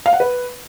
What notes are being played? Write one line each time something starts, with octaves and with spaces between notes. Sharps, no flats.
F5
F#5
B4